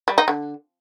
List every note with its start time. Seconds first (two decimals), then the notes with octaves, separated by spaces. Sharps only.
0.08 G3
0.18 D#4
0.28 D3